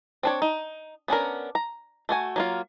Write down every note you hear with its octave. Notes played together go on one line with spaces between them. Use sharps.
C4 D4 C#5
D#4
B3 C#4 D4 A#4
A#5
A3 F#4 G#5
F#3 A#3 F4